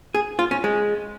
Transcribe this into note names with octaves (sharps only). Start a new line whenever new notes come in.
G#4
F4
C#4
G#3